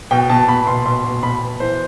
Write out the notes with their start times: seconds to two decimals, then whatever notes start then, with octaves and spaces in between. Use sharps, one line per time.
0.11 B2 G5
0.30 B2 A5
0.48 B2 B5
0.67 B2 C6
0.86 B2 C6
1.04 B2
1.23 B2 B5
1.41 B2
1.60 E3 C5